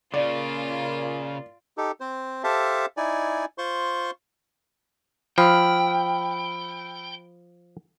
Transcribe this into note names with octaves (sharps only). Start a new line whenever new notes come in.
A#2 C#3 A#3 F4 D5
D#4 G4 A4
C4 C5
G4 A4 C5 E5 F5 A5
D#4 E4 D5 G#5
F4 C5 C6 C#6
F3 G5 B5 E6 F6